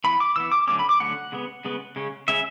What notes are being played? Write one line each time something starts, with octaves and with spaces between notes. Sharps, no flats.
E3 B3 B5
D6
E3 B3 E6
D6
D3 F#3 A3 C#4 D6
B5
D6
D3 F#3 A3 C#4 F#5
C#3 G#3 B3
C#3 G#3 B3
C#3 G#3 C#4
C#3 G#3 C#4 E5